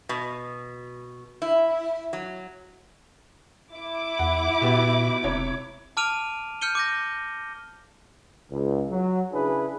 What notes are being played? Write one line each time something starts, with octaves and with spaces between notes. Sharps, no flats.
B2
E4
F#3
E4 D6
E2 F#5
A#2 B3 F#4 G4
E1 C3 C#5 G#6
A5 D6 F6 D7 D#7 F7
F6 G6 C#7 D#7 G7
D6 G6 A#6
C#2
F#3
C#3 D4 E4 G#4 B4